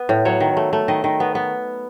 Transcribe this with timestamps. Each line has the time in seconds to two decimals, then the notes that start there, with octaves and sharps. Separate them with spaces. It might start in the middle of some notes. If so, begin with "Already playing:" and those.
Already playing: B3
0.09 A2
0.25 F#3 C#5
0.40 D#3
0.57 A3
0.73 A3
0.88 D#3 D#5
1.04 D#3
1.20 B3
1.35 B3